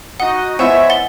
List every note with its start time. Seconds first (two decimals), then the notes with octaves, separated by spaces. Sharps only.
0.20 D#4 F#4 D#5 F#5
0.59 B3 E4 C5 C#5 D#5 E5 F#5 G#5
0.90 F#5 A6 G7